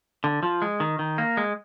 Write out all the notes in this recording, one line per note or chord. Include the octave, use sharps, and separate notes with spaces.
D3
F3
G#3
D#3
D#3
A#3
G#3